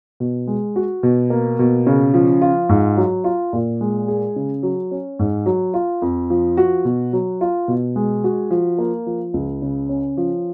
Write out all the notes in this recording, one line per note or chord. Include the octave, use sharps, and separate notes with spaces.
B2
G#3
F#4
B2
A#3
B2
C#3
F3
F4
G#2
F#3
F4
A#2
G#3
G#4
C#3
F#3
C#4
G#2
F#3
F4
F2
F3
F#4
B2
F#3
F4
B2
G#3
F#4
F3
A#3
F3
C#2
C#3
C#4
F3